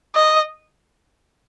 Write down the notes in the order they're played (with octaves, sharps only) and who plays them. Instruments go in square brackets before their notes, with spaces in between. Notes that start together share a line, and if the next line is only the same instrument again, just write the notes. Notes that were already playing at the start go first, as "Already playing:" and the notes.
[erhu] D#5